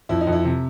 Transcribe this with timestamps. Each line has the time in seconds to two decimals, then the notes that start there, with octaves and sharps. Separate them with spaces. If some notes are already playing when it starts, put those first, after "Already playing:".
0.09 F2 E4
0.21 D#4
0.27 F2
0.32 E4
0.45 C3